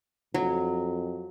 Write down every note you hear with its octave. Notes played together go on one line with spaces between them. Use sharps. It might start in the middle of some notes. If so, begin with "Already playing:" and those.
F2 F#3